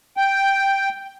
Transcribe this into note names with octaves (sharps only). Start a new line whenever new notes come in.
G5